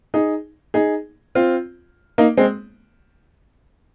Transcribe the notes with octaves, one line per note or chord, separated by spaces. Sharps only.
D#4 G#4
D#4 G#4
C4 F4
A#3 D#4
G#3 C4